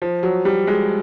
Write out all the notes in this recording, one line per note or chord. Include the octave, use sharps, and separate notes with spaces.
F3
F#3
G3
G#3